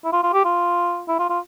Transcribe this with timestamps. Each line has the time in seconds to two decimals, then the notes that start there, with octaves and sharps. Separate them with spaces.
0.05 E4
0.13 F4
0.23 F4
0.33 G4
0.45 F4
1.08 E4
1.19 F4
1.30 F4